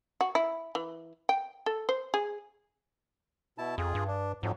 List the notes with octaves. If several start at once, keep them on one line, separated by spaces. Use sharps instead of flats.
F#4
E4
E3
G5
A4
C5
G#4
B2 E4 A5
F2 F4 G#4
G2
D4
F2 G#2 F3 F#3